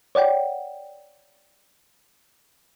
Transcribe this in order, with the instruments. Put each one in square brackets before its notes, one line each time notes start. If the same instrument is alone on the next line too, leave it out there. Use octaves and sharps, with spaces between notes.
[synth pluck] C#5 D5 F#5 G5